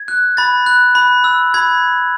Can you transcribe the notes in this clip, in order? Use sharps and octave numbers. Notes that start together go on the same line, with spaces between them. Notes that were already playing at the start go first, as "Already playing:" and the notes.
Already playing: G#6
F#6
B5 A6
F#6
B5
E6
B5 G#6